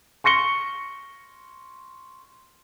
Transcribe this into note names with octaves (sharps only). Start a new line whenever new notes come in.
C6 C#6 A#6 C#7 G7